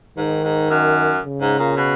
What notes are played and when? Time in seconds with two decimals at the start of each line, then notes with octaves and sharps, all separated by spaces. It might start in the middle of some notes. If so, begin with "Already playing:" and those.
0.18 G#2 D#3
0.44 G#2
0.70 F#2
1.24 C#3
1.41 G#2
1.59 A#2
1.77 B2